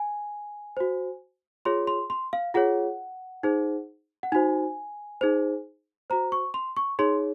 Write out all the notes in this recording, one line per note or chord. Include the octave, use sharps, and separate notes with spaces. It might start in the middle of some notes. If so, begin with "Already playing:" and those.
Already playing: G#5
F#4 C5
F4 G#4 C#5 C6
C6
C6
F5
F4 G#4 C#5 F#5
D#4 G#4 C5
F#5
D#4 F#4 C5 G#5
D#4 G#4 C5
F#4 C5 A#5
C#6
C6
C#6
D#4 G#4 C#5 C6